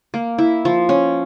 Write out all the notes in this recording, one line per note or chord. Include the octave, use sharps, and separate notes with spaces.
A#3
E4
F3
C#4